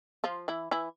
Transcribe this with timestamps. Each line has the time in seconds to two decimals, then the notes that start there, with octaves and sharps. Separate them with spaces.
0.24 F3 F4
0.48 E3 E4
0.71 E3 E4